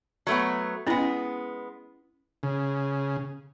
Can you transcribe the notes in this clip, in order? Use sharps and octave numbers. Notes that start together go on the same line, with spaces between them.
F#3 A3 B3
G#3 B3 C#4 E4
C#3